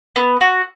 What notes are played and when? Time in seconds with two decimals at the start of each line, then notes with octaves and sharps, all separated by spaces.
0.16 B3
0.41 F#4